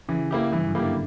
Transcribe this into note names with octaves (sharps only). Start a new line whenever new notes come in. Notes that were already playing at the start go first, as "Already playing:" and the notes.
C#3 E3
A#3 E4 G4
G2 E3
F#2
A#3 E4 G4
D3